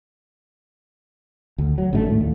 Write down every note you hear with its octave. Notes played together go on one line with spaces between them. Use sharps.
D2
F#3
A1 G#2 D3 A3
D#2 A2 A3
D#2